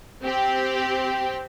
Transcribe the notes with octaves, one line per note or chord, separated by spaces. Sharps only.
C4 G4